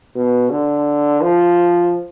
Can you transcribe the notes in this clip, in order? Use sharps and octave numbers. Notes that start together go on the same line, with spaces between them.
B2
D3
F3